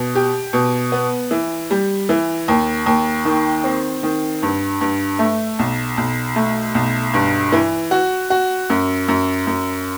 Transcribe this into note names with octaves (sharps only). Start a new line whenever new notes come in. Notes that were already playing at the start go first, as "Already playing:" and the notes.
Already playing: B2
G4
B2
B3
E3
G3
E3
D#2
D#2
D#3
C4
D#3
G2
G2
A3
B1
B1
A3
B1
G2
E3
F#4
F#4
F#2
F#2
F#2